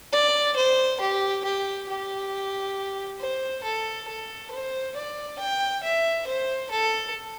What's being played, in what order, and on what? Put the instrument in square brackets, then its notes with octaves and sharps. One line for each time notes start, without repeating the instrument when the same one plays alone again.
[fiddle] D5
C5
G4
G4
G4
C5
A4
A4
C5
D5
G5
E5
C5
A4